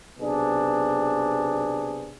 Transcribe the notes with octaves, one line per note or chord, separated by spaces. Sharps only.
B1 C3 B3 D4 G#4